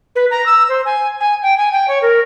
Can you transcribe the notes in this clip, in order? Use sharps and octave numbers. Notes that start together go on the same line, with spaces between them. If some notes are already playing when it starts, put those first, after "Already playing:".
B4
A#5
E6
C5
G#5
G#5
G5
G#5
G5
C#5
A#4